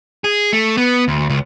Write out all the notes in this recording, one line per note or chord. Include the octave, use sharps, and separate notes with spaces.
G#4
A3
B3
D2
C#2